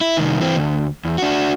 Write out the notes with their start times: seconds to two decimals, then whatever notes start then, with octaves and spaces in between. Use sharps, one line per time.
0.01 E4
0.17 C2 D#3
0.40 E3 C4
0.57 D2
1.05 E2
1.18 D4 F#4